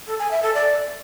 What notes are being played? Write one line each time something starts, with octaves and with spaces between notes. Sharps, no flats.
A4
G#5
E5
A4
D5